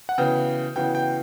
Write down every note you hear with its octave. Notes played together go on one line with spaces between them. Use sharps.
F#5
C#3 E3 B3 F#4 G5
C#3 E3 B3 F#4 G5
G5